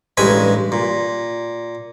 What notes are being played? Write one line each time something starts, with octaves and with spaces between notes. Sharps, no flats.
A1 G2 G#3 G#5 B5
A#2